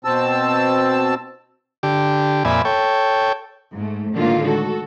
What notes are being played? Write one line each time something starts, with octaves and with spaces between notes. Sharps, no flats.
B2 C4 A5 E6
D3 G4
F2 A#2 D5 E5 G#5 B5
A4 C#5 G5
G#2 A3
A2 D3 D#3 G#3 A#3 F4
F#4 A4